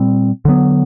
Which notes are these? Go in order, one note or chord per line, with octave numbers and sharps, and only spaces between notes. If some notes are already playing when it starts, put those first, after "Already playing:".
Already playing: A#2 G3 C4
D3 F#3 B3